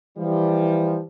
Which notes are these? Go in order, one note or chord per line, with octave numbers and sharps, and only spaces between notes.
E3 F3 G3